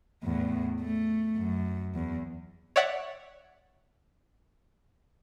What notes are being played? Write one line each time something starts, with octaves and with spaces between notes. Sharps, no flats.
E2 A2
A3
F#2
E2
C#5 D5 E5 F#5